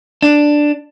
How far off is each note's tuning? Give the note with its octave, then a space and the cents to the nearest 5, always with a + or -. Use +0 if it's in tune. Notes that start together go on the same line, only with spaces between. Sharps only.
D4 +5